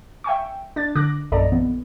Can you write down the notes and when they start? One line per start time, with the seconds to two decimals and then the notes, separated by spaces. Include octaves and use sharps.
0.24 E5 G5 G#5 C#6
0.76 D4 A6
0.95 D3 D6 F#6 A#6
1.32 A#1 F#2 A4 D5 D#5 A#5
1.52 A#1 E3 B3